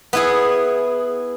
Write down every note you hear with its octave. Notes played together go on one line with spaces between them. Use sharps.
B3 E4 G#4